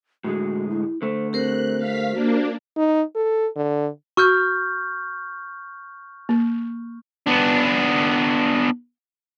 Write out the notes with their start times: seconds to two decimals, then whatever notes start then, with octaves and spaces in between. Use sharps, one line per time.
0.24 A2 D3 G#3 F#4
0.70 E4
1.02 D3 A3 C5
1.33 C4 G4 A#4 C5 F#6
1.77 F5 B6
2.13 A#3 D4 F#4
2.77 D#4
3.15 A4
3.56 D3
4.17 F#4 C#6 F6 G6
6.29 A#3
7.26 B3 D4